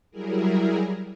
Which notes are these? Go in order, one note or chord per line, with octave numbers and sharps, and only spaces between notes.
F#3 G3 E4 G#4 A#4